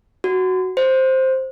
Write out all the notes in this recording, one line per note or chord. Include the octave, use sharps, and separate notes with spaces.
F#4
C5